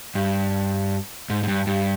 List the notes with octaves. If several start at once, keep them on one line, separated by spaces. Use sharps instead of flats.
G2
G#2
G#2
G2
G2